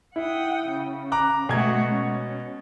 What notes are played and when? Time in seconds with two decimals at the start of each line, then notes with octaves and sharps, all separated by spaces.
0.16 E4 F#5 G5 D#6
0.68 C#3
1.12 A#5 D6 F#6
1.49 B2 G#3 A3 F#4 G#6
1.88 C#4